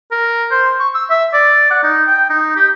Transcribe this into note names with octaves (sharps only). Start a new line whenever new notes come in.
A#4
C5
C#6
E6
E5
D5
F#5
D#4
G5
D#4
G4